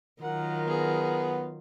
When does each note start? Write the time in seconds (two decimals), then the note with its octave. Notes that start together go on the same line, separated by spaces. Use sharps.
0.23 D#3 F#3 F4 A#4 F#5
0.68 B3 G#4